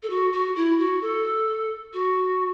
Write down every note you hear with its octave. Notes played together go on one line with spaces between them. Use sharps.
A4
F#4
F#4
E4
F#4
A4
F#4